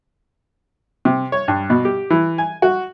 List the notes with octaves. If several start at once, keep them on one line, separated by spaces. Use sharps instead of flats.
C3
C#5
G2
B2
G4
E3
G#5
F#4